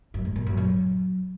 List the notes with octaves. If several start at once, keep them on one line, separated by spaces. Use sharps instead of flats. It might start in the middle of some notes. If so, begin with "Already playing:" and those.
F#2
G#2
A#2
F#2
F#3